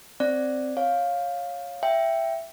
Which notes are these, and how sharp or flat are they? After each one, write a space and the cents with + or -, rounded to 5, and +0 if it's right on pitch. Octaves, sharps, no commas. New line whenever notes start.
C4 +0 D5 +0
C#5 +0 F5 +10
E5 +10 G5 +0